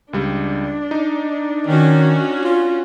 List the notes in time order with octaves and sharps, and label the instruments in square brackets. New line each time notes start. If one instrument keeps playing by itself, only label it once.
[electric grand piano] C#2 G3 [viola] D4
[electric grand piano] D#4
[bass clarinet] D#3 [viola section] C#4 F#4
[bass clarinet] F4